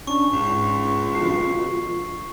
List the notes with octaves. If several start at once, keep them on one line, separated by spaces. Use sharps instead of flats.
C#4 D4 C#6
C#2 G#2
B2 D3 F3 C7